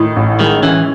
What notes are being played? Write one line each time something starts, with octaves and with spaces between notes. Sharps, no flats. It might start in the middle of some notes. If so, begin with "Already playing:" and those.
Already playing: A2 D#3
A1
D#3 G#3
E3 C#4